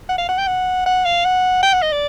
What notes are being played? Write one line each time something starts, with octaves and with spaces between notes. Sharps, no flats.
F#5
F5
F#5
G5
F#5
F#5
F5
F#5
G5
F#5
D#5
D5